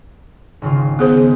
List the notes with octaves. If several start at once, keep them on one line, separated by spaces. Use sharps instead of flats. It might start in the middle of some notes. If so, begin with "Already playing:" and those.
G#1 C#3 F4
B3 G#4 C5